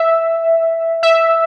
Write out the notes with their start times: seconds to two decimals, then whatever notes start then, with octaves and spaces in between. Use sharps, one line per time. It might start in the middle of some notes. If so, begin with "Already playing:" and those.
Already playing: E5
1.03 E5